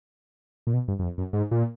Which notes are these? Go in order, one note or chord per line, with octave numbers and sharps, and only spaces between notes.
A#2
B2
G2
F#2
F2
F#2
G#2
A#2